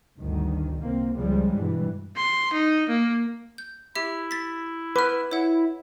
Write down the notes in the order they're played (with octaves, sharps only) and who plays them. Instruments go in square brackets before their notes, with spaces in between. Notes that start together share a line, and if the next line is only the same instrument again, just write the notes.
[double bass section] G1 D2 D#3
C2 A#3 C4
C#2 C#3 F3 G3 G#3
G2 B2 E3
[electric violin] C6
D#4
A#3
[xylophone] G6
[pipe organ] E4 [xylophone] G4 E5
[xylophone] A6 B6
[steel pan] B4 [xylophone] D6 F6
[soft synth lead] E4 [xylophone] C#5 F#5